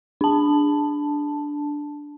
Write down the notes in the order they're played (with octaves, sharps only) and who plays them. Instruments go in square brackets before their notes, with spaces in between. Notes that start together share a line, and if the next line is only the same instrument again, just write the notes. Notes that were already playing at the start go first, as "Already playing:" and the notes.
[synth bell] D4 A5